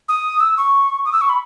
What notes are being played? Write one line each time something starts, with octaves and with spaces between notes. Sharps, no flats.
D#6
E6
C#6
D#6
E6
C#6
B5